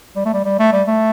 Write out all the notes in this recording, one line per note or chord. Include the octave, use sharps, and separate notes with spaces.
G3
A3
G3
G3
A3
G3
A3